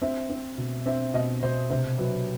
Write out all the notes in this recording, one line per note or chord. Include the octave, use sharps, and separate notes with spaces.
C4 E5
C4
B2
C4 E5
B2 D#5
B2 C5
C3 C5
F#3 B4